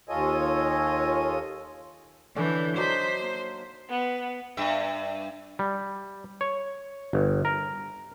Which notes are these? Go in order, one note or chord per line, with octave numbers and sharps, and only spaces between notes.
D#2 F4 A4 C#5 D#5 G#5
D3 E3 C#4 D4 G6
F#3 D4 D#4 C5 G6 B6
A#3
B3
G2 E5
G3
C#5
G1
A#4